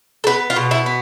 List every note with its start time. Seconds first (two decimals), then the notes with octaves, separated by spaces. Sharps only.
0.24 A4
0.27 B3 B4
0.50 F4
0.56 B2
0.71 E4
0.86 B3